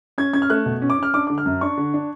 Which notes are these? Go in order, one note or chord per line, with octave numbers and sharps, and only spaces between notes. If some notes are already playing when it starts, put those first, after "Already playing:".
C#4 G#6
C#4 G#6
F6
A3 F#6
B2
C#4
D6
C#4 F6
D4 D6
D3 D6
F6
F#2
D4 C#6
D3
D4